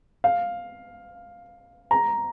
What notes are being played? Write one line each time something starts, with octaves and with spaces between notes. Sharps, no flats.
F5
A#5